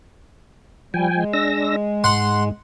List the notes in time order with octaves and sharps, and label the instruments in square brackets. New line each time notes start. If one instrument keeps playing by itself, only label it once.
[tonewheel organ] F3 G5 G#5 [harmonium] G3
[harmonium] G#3
[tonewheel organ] D4 E6 A#6
[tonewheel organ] G#2 [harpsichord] F#5 C6